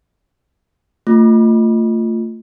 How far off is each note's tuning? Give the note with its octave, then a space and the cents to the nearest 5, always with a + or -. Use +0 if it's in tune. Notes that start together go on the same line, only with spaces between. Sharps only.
A3 +30 F4 +0